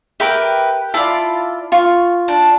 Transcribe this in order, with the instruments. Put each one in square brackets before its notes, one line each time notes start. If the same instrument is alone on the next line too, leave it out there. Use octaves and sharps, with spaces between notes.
[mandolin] G4 [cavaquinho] A#4 B4 E5
[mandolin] E4 F4 D5 [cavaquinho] A5
[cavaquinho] F4 [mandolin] C#6
[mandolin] D4